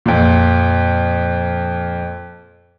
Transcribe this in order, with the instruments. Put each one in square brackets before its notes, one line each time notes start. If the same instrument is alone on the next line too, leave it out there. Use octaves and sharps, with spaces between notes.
[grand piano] F2 A#2